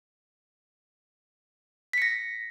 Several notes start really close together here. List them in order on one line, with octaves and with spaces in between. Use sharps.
B6 C#7 A#6